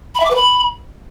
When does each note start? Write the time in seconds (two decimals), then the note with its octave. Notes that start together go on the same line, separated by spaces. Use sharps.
0.15 B5
0.20 E5
0.25 D6
0.30 B4
0.36 B5